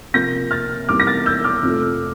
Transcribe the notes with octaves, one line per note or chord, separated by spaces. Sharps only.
C3 F3 A#3 G6 A#6
F6 A6
E2 C3 G3 A#3 D6 F6
A#6
F6 A6
E6 G6
D6 F6
F2 C3 F3 A3